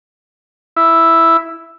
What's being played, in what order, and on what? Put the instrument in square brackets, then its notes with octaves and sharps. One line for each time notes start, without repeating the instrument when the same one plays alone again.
[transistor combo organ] E4